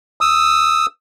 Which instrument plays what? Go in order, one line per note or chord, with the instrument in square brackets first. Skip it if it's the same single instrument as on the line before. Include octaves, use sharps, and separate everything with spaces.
[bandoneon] D#6 E6